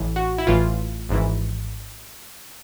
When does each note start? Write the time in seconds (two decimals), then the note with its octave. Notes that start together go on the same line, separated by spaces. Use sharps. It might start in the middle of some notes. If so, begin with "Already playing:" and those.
Already playing: A1 A2 E3
0.16 F#4
0.38 E4
0.47 A1 A2 E3 F4
1.09 G#1 G#2 E3